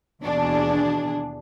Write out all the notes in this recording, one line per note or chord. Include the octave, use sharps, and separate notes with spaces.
D#2 B2 E3 D4 G#4